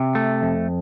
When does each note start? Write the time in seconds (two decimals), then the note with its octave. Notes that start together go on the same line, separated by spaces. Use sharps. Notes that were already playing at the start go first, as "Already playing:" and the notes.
Already playing: C3
0.15 A3
0.42 F2